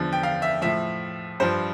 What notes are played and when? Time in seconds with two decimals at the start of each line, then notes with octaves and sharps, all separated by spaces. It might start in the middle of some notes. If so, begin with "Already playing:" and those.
Already playing: E2 D3 F3
0.12 G5
0.23 F5
0.42 E5
0.61 A2 F3 E5
1.40 G2 F3 C5